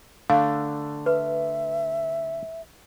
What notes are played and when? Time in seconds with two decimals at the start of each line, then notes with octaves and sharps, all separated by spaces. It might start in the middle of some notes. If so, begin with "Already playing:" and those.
0.30 D3 A3 D4 F5
1.06 B4 E5